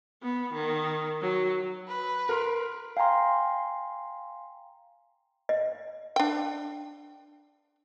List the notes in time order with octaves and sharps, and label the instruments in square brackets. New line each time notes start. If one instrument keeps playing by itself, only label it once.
[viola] B3
D#3
F#3
[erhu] B4
[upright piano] A#4 C6
[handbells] F5 G5 G#5 A#5 C6
[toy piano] D#5
[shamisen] D4 G5